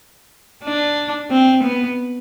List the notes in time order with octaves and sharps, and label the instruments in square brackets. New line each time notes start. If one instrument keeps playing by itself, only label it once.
[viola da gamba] D4
C4
B3